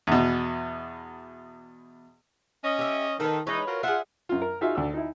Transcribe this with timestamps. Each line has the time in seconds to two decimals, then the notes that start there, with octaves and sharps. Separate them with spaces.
0.07 E2 B2
2.63 C#4 D#5
2.79 G4 E5
3.20 D#3 A4 B4
3.47 E3 G#3 D#4 B4 C#5
3.67 F4 F#4 A#4
3.83 F4 G#4 E5 F#5
4.29 F#2 F4
4.42 A#4
4.61 D#4 F4 F#4 G#4 E5 F5
4.75 D2 D5 E6
4.94 D#4 E4